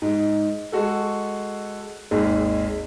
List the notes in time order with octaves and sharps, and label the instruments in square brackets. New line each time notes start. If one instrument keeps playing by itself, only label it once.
[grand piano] G#2
G#3 F#4 A4
G#1 D#2 G#3